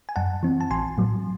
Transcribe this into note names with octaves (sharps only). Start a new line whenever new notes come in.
G#5
F#2 F#5 A5
E3 C4
A5
A1 G#5 C6
A2 F#3